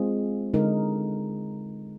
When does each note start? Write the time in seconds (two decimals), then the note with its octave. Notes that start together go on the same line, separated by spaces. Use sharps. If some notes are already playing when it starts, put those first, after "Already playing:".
Already playing: G#3 C4 F4 G#4
0.54 D3 G#3 D#4 A#4